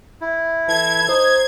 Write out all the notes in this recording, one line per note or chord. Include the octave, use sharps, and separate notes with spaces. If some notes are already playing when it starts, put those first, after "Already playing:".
E4
E3 A4 G#6
D#4 C5